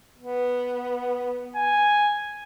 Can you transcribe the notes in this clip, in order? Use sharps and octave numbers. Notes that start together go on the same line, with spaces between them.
B3
G#5